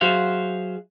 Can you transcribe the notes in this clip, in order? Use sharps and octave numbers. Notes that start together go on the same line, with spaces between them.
F#3 F#4 G#4 C5 E5 F5